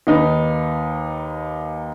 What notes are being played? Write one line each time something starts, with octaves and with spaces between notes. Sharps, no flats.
D#2 D#4 B4